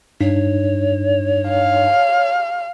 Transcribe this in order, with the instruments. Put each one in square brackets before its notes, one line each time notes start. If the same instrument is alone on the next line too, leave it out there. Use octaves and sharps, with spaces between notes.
[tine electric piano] G2 D4 D#4 [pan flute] C#5
[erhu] F5